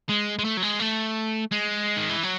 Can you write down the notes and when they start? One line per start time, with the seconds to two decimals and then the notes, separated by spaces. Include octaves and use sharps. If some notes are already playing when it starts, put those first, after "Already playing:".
0.09 G#3
0.39 G#3
0.44 A3
0.57 F#3
0.62 G#3
0.80 A3
1.52 G#3
1.97 D#3
2.09 E3
2.23 F#3